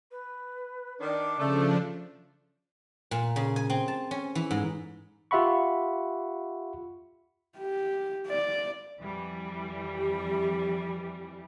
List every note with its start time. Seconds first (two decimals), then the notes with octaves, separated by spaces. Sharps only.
0.11 B4
1.00 D#3 D4 D5
1.40 C#3 F3 A3 D4
3.11 A#2
3.36 C#3
3.56 G#5
3.70 C4
3.88 A5
4.11 C#4
4.35 E3
4.51 G#2
5.31 F4 G4 E5 F#5 B5 C#6
7.58 G4
8.28 D5
9.01 F2 E3 G3
9.96 G4